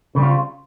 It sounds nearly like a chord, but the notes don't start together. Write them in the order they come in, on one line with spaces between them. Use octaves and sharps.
C#3 G3 C4 F4